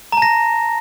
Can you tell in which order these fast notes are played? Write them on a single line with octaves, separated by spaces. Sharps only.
A#5 A5 A#6